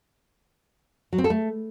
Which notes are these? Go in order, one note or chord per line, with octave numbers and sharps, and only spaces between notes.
F#3
C4
A4
A3